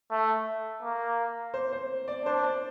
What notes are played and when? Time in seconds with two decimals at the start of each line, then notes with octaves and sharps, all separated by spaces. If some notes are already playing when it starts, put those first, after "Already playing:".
0.11 A3
0.83 A#3
1.54 C5
1.73 C5
2.08 D5
2.25 D4 C5
2.43 D5